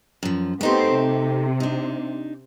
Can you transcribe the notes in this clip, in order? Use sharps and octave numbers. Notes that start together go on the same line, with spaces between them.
F#2 F3
A3 B3 C4 D#4 G4 C5
C3
D4 D#4